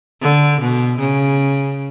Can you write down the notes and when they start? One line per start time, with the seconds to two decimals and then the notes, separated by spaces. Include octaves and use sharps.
0.22 D3
0.61 B2
0.99 C#3